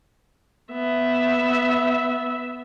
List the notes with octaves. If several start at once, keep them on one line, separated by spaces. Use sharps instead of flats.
B3 E5